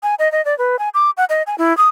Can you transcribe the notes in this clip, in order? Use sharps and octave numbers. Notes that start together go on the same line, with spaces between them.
G#5
D#5
D#5
D5
B4
G#5
D6
F#5
D#5
G#5
E4
D#6